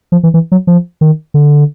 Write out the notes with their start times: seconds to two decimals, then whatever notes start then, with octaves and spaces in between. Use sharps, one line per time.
0.12 F3
0.23 E3
0.34 E3
0.52 F#3
0.67 F3
1.01 D#3
1.34 D3